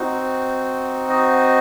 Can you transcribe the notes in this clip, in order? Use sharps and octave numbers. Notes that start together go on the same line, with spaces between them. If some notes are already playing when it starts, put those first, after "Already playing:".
Already playing: C4 D#4 F#4
D#5